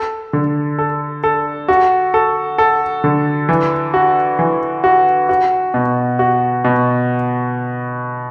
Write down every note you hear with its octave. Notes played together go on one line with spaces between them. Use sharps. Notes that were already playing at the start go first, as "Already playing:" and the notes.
Already playing: A4
D3
A4
A4
F#4
A4
A4
D3
E3
F#4
E3
F#4
F#4
B2
F#4
B2